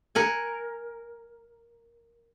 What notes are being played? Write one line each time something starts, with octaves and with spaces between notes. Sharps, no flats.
A#4 F#5 G#5